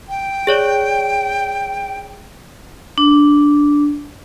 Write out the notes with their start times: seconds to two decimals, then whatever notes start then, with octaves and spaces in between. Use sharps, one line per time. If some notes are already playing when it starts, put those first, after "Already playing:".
0.09 G5
0.47 G#4 C#5 D5
2.98 D4